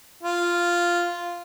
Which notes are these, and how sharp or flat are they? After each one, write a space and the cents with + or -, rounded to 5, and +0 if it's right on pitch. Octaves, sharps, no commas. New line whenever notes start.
F4 -5